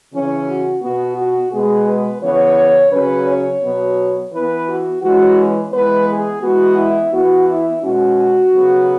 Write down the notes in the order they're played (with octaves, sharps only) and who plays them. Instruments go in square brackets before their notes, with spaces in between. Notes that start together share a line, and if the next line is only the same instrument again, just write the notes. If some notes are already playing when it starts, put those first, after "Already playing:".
[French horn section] C#3 E3 C#4
F#4
B2 B3 F#4
F#4
B2 G#3 B3 G#4
B4
C#3 E3 B3 C#5
C#3 F#3 C#4 B4
C#5
B2 F#3 B3
E3 B3 B4
F#4
E3 G#3 C#4 F#4
B4
E3 G#3 B3 B4
G#4
E3 G#3 B3 F#4
E4
E3 B3 F#4
E4
B2 G#3 C#4 F#4
C#3 F#3 B3